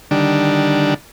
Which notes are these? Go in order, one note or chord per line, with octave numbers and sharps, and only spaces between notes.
D3 D#3 G3 D4